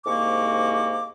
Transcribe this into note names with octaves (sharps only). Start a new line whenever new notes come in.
C2 G#2 A#3 C#6 D6